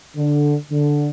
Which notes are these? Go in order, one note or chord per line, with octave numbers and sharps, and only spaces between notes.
D3
D3